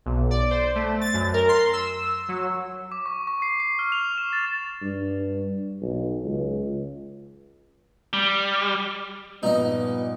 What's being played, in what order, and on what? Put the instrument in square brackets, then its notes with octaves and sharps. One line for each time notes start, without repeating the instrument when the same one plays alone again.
[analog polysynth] B1
D5
C5
A3
A6
F#2
A#4
C6
E6
F#3
[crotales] D6
C#6
C#6
C7
C7
F6
F7
E7
A6
[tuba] G2
B1
C#2
[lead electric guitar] G3
[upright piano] G2 A#2 F3 [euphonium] B3 [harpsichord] D#4 D#5